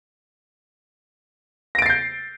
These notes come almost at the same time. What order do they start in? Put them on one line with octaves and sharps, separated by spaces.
A#6 D7 A6 C7 G6